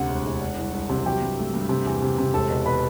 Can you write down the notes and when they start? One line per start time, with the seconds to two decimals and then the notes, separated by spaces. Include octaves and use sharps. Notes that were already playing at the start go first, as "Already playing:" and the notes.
Already playing: D2 C3 F#5
0.09 E1
0.26 E1
0.41 D4
0.58 C2
0.73 C2
0.89 C3
1.05 F#3 G4 G5
1.21 G2
1.38 A3
1.54 G2
1.69 C3
1.86 E2
2.02 C3
2.18 C3
2.33 E1 A4 A5
2.50 B2
2.65 B2 B4 B5